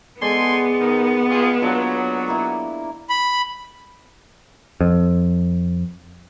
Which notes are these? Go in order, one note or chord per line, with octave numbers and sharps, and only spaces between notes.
G#3 B3 A4 D5 G#5 C6
D#3
F4 G4 G#4
F#3 A#3 D4 F4
A#3 E4
B5
F2